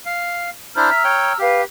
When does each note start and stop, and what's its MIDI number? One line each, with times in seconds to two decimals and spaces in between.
0.06 0.50 77
0.76 0.90 62
0.76 0.90 64
0.76 0.90 72
0.76 1.38 82
0.76 1.38 88
0.76 1.38 89
0.90 1.03 76
1.04 1.33 73
1.04 1.33 79
1.39 1.64 67
1.39 1.61 71
1.39 1.61 77